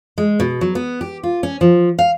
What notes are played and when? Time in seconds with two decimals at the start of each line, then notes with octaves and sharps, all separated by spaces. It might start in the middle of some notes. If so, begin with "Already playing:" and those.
0.18 G#3
0.40 B2
0.61 F#3
0.75 B3
1.01 G4
1.23 F4
1.43 C#4
1.61 F3
1.99 F5